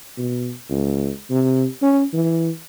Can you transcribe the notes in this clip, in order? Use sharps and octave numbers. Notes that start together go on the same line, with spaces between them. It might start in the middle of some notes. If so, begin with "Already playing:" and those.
B2
C#2
C3
C#4
E3